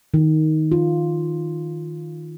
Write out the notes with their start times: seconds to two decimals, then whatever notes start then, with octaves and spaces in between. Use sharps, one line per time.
0.14 D#3
0.72 F4